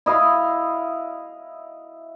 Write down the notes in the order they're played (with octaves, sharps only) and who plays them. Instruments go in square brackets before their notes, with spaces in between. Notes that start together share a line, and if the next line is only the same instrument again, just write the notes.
[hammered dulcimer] E4 D#5 F5 B5